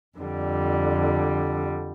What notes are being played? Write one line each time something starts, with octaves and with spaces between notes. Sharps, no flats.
F2 D3 G3